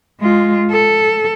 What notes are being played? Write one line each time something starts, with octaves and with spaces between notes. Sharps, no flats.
G#3 F4
A4